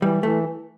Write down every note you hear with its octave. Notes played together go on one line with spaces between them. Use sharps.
E3 G3
E3 A3